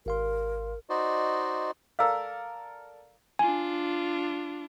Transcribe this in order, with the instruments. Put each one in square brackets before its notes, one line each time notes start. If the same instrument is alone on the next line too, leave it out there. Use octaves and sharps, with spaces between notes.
[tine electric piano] G#1 F5 C6 [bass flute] A#4
[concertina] D#4 F#4 C5 D5 D#5
[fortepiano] A4 A#4 D5 [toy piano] F5 E6
[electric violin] D4 F4 [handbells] G#5